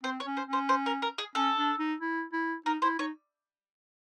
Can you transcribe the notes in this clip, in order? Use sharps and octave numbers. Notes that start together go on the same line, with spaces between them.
C4 C5
C#5
C#4
C5
C#4
C5
C5
A#4
A#4
G#4
C#4 A4
D4
D#4
E4
E4
D#4 A#4
E4 C5
D#4 C#5